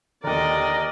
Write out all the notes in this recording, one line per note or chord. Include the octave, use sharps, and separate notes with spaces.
D#2 D3 A#4 D5 D#5